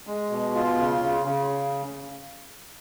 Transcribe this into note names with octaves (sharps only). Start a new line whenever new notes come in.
G#3
B2
F4
C#3
C#3
C#3